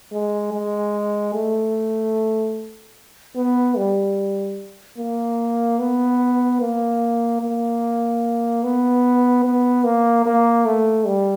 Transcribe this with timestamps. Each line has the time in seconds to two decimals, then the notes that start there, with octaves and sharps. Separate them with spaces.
0.12 G#3
0.53 G#3
1.34 A3
3.36 B3
3.77 G3
4.98 A#3
5.79 B3
6.61 A#3
7.41 A#3
8.64 B3
9.45 B3
9.84 A#3
10.26 A#3
10.65 A3
11.06 G3